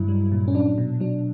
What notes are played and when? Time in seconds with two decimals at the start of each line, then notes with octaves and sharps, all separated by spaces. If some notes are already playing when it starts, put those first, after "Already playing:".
Already playing: G2 F#3 E4
0.08 G3
0.32 A#2
0.48 C#4
0.55 F#3 D4
0.78 B2
1.00 F#3 D4